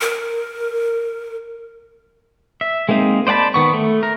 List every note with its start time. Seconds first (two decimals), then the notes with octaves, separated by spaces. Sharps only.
0.01 A#4
2.61 E5
2.89 G#3 A#3 C4 D#4
3.27 C5 D5 F#5 A5 B5
3.54 D#3 B3 C#6
3.74 A3
4.03 A#4